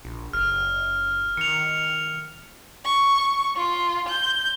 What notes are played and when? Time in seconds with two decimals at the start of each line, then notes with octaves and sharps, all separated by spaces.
0.05 A#1
0.33 F#1 F6
1.37 D#3 C#7 F7
2.85 C#6
3.56 F4
4.09 G6